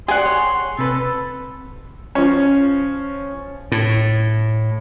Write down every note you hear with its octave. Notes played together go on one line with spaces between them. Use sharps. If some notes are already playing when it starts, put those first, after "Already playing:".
G4 G#4 D5 F#5 C6
C#5
C3 A4 B4
F3 C#4
A2